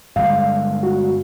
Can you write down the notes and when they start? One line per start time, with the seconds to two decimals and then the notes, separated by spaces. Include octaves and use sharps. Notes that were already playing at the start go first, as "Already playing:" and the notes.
0.16 G2 D3 G#3 F5
0.83 F#4